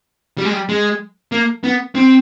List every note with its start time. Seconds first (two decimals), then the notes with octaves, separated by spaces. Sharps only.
0.38 G3
0.45 G#3
0.53 G3
0.69 G#3
1.32 A#3
1.64 B3
1.95 C4